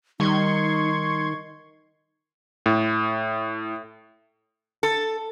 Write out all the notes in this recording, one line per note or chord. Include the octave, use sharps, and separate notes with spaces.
D#3 G3 D#4 C6 C#6 G#6
A2
A4